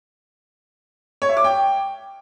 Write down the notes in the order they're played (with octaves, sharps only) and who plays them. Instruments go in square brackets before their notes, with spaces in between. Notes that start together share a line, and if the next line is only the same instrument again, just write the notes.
[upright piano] C#5
E5
D6
G5